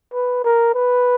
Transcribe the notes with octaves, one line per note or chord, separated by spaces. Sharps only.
B4
A#4
B4